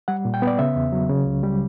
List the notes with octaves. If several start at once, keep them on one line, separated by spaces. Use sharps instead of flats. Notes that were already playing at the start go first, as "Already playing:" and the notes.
G3 F#5
A#2
G5
B3
D5
C#3 E5
E2
F#3
C#3
C#2
G3